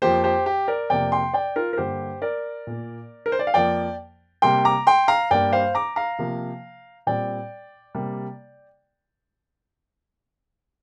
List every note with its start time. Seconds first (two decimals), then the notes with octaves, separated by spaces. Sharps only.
0.02 F2 F3 A#3 G4 C5
0.24 G4 C5
0.46 G4
0.68 A#4 D5
0.90 F2 C3 A#3 D5 G5
1.12 G5 C6
1.34 D5 G5
1.56 F4 A#4
1.73 A#4
1.78 G2 D3 A#3 G4 C5
2.22 A#4 D5
2.67 A#2 A#3
3.26 A#4
3.32 C5
3.39 D5
3.47 F5
3.54 F2 F3 A#3 D5 G5
4.42 C3 G3 A#3 G5 C6
4.65 A#5 D6
4.87 G5 C6
5.08 F5 A#5
5.31 G2 G3 A#3 D5 G5
5.53 C5 F5
5.75 A#5 D6
5.96 F5 A#5
6.19 C3 F3 A#3
7.07 A#2 G3 C4 D5 G5
7.95 C3 G3 A#3